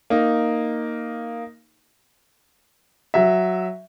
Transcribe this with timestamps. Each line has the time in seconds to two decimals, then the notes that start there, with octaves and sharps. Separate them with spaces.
0.10 A#3 D#4
3.14 F#3 E5